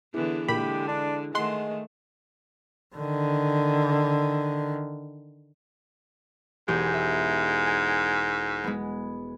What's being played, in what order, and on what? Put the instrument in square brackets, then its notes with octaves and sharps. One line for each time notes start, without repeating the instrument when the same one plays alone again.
[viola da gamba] D3 E3 B3 [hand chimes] E4 G#4
[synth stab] A#2 B5 [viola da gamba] D3 G#3 [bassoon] G4
[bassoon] D4
[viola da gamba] D#3 A3 [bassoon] G#3 [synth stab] F#5 C6
[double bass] D3 D#3
[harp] E1 G4 G#5 [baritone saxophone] G#2
[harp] E5
G#5
G#3 B3